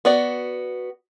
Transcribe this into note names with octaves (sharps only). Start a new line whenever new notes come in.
B3 F#4 D5